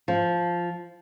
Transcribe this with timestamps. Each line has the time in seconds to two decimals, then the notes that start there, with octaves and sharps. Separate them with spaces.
0.08 F3